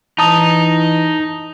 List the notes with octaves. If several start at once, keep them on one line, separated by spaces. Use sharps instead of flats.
E3 D#4 A5 A#5 D#6